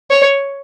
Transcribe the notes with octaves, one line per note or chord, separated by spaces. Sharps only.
C#5